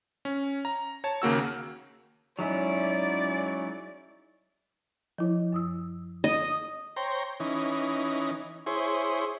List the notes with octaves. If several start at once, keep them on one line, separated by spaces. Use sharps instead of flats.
C#4
A#5
C#5 A5
D#2 C#3 A#3 F#4 E6
F#3 G#3 C#4 D#4 E4 D5
F3 E4 C#5
F#2 D#6 E6
D#5
C5 C#5 G5 A#5
E3 C#4 D#4
E4 G#4 C5 C#5